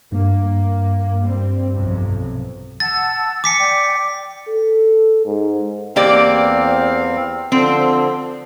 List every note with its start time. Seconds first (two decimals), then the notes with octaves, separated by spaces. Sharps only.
0.12 G2 A#3
1.21 G3 C4
1.73 B1 F2 C3
2.80 F#5 A5 E6 A6
3.44 G#5 D6 B6 C#7
3.59 D5 G5
4.48 A4
5.26 G#2
5.96 E2 A#3 C4 G4 D5 F5
7.52 D3 F3 C4